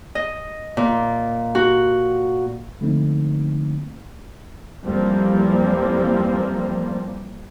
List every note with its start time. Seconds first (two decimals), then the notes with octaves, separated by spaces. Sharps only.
0.15 D#5
0.77 A#2
1.55 F#4
2.81 D3 F3 A3 A#3 C4 D#4
4.85 F2 E3 F3 G3 A#3 C4